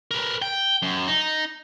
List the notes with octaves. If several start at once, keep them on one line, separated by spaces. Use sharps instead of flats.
A#4 B4
G5
F#2
D#4